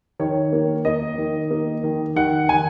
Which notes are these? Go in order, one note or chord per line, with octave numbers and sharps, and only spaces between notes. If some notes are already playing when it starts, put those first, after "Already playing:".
D#3 C#5
A#3
A#3 D#5
D#3
A#3
D#3
D#3 F#5
D#3 G#5